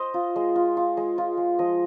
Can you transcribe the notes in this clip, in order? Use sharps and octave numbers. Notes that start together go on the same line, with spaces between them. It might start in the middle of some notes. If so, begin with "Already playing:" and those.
Already playing: C5 D#5
F4
G#3
F4
F4
G#3
F4
G#3
F3 D#5